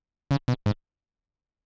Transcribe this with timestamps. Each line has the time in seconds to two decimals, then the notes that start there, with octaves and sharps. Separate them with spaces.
0.31 C#3
0.48 B2
0.66 G#2